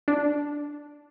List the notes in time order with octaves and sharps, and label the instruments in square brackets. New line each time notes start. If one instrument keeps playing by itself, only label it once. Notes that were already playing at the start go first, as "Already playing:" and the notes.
[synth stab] D4